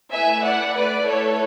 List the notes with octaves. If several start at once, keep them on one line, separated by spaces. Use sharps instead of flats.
A3 E4 B4 E5 G#5
D5 F#5
B4 D5
A4 C#5